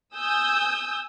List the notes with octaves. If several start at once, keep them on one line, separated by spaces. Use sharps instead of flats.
G#5 D#6 E6 G6